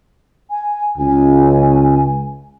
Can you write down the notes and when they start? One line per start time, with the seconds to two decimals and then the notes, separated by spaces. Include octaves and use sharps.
0.50 G#5
0.98 C#2 G#5